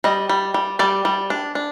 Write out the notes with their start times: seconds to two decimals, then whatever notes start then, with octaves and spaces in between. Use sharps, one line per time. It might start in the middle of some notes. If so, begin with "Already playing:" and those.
0.04 G3 D#5
0.29 G3
0.54 G3
0.79 G3 D5
1.05 G3
1.30 D4
1.55 D4